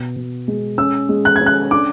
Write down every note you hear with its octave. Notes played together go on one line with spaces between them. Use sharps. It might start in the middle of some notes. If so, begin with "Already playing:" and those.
Already playing: B2
B2
G#3
C#4 E6
G#3
F#6
G#6
C#4
F#6
D4 D6